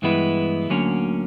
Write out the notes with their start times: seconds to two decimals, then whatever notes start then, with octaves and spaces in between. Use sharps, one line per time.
0.02 G2 E3 G#3 B3 E4
0.70 D2 D3 F#3 A#3 C#4